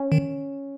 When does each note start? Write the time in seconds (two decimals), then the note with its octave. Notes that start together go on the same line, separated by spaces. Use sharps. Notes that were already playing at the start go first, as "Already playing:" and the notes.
Already playing: C#4
0.12 D#3